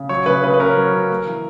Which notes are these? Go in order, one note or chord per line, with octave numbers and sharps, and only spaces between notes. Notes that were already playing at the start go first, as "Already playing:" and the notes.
Already playing: C#3
F#3 C#5
C#3 B4
C#3 B4
B4
C#4 A#4
F#3
C#3
A#3
E3